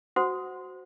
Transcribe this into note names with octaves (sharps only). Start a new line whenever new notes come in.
F#4 C5 F#5 D#6